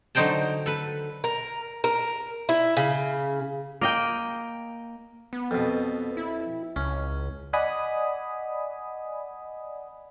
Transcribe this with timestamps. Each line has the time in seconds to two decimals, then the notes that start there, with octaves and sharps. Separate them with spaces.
0.15 D3 F#3 D#4 C5 G5 A5
0.66 A4 B4
1.24 A#4
1.84 A#4
2.49 E4
2.77 C#3
3.81 A#3 D#5 G5
5.33 B3
5.51 F2 B2
6.17 E4
6.76 C#2 C#4
7.53 D5 D#5 F#5 G#5 B5 D#6